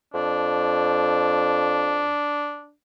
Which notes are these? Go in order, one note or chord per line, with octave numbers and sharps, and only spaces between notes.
F2 D4